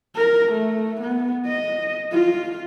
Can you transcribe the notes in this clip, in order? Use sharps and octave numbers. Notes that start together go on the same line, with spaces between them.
A#4
A3
B3
D#5
F4